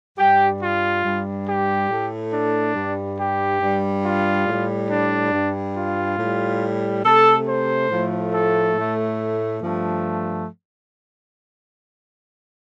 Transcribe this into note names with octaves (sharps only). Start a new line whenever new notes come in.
G2 G3 G4
F4
G2 G3
G4
A2 A3
D4
G2 G3
G4
G2 G3
F4
A2 G3
D4
G2 G3
F4
A2 G3
C3 A3 A4
C5
A2 F3 A3
A4
A2 A3
G2 F3 A3